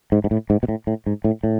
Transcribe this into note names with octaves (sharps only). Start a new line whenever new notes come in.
G#2
G#2
A2
G#2
B2
A2
A2
G#2
A2
A2